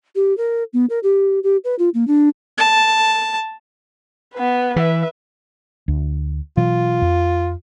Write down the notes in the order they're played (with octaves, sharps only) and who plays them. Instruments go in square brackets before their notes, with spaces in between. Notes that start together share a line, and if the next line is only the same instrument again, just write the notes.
[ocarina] G4
A#4
B3
A#4
G4
G4
B4
F4
A#3
D4
[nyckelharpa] A5
[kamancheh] B3 B4
[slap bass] E3 [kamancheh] B4 E5
[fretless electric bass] D2
[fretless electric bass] B2 E3 F#3 [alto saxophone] F4
[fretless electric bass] F2